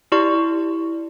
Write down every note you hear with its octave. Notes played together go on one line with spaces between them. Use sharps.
E4 G4 D5 C6 C#6